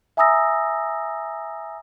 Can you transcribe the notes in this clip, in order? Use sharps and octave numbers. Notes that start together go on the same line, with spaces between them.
E5 G#5 A#5 D#6 E6 A#6